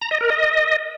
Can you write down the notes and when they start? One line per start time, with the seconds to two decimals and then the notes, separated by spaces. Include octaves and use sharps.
0.01 A#5
0.11 D#5
0.21 A#4
0.30 D#5